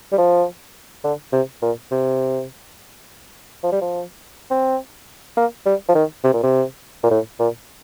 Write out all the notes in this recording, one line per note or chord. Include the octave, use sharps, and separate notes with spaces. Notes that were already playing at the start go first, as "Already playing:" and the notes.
G3
F3
D3
C3
A#2
C3
F3
G3
F3
C4
A#3
G3
F3
D#3
C3
A#2
C3
A#2
A2
A#2